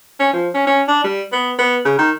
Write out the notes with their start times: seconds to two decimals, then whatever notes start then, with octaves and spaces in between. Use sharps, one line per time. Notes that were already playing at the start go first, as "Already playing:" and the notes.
0.20 C#4
0.33 F3
0.54 C#4
0.67 C#4
0.88 D4
1.04 G3
1.32 B3
1.58 B3
1.85 C#3
1.99 D#3